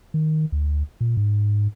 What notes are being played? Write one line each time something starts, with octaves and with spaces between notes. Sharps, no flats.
D#3
D2
A#2
G#2